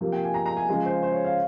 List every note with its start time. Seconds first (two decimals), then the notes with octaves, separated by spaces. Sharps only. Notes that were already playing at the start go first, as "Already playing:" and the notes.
0.01 C3 F3 A#3
0.12 G5
0.24 G#5
0.34 A#5
0.46 A#5
0.57 G#5
0.69 C#3 F3 G#3 G#5
0.86 C5
1.03 C5
1.13 C#5
1.25 F5